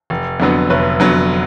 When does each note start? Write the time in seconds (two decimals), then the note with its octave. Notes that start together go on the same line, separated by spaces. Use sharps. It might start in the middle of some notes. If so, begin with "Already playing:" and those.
0.10 F1
0.40 F2 D3 F#3 B3
0.70 F1 B4 C#5
1.00 F2 D3 F#3 B3